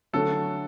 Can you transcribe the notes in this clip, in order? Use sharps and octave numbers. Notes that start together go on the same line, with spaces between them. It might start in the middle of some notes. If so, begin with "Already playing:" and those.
D3 F#3 A3 C#4 F#4 A4